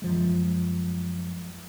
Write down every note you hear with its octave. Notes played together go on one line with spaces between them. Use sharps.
F#2 F3 G#3